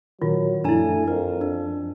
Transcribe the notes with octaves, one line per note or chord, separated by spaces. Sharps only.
A#2 D#3 F#3 F4 A#4
F#2 F3 A3 D4 E4 G#5 A#5
F2 A#4
D4